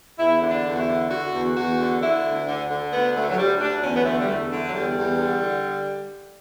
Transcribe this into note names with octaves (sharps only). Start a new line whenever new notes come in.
E2 E4
D3
D4
E2
F#4
E4
D3
D3 F#4
E2
E2 F#4
D3
D3 E4
D2
D3
D3
D2 B3
D2 A3
F#3
D2 G3
D2 D4
E2 C#4
B3
D3 A3
G3
E2 A3
D3 A3
F#3
E2 G3
E2
D3
D3